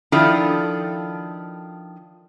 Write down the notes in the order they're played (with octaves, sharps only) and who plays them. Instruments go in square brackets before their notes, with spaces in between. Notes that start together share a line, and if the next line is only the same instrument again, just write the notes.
[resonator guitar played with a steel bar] D#3 F3 D4 E4 F4 A4